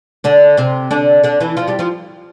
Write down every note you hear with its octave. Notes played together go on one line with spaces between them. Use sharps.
D3 D4
C3 C4
D3 D4
D3 D4
E3 E4
F3 F4
G3 G4
F3 F4